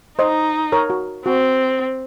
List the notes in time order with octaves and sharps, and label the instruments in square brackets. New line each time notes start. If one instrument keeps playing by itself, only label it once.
[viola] D#4 [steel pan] C5 D#5
[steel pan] A#4 C#5
F#4
[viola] C4 [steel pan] F#4